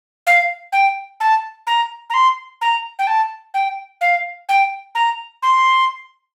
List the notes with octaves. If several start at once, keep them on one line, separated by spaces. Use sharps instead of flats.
F5
G5
A5
A#5
A#5
C6
A#5
G5
A5
G5
F5
G5
A#5
C6